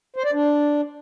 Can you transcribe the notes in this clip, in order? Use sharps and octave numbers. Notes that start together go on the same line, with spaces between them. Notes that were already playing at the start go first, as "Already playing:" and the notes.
C5
D5
D4